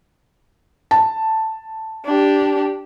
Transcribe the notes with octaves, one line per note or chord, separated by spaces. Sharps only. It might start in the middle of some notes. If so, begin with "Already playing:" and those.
A5
D4 G4